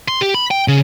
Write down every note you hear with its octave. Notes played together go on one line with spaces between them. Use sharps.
C6
G4
B5
G5
C#3